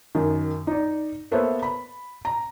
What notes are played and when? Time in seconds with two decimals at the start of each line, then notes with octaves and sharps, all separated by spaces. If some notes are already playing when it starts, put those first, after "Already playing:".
0.15 F#2 D#3
0.67 D#4 D5
1.31 A#3 B3 A4 C5 C#5 E5
1.63 B5
2.25 A#5